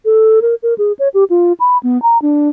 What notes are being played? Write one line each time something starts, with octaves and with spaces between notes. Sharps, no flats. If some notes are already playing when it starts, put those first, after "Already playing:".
A4
A#4
A#4
G#4
C#5
G4
F4
B5
B3
A#5
D4